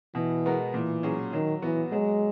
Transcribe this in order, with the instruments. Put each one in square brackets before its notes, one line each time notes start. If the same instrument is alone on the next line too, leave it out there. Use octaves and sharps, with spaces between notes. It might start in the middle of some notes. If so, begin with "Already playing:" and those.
[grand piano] B2 [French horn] E3
[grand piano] G#3 B3 F#4 A#4
[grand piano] A#2 [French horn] E3
[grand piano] F#3 C#4 G#4
[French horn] D#3 [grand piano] F#3
[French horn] E3 [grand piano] B3 F#4
[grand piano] F#3 [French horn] G#3